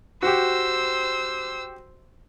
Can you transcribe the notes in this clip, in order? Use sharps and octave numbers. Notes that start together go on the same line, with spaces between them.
F#4 G4 C5 E6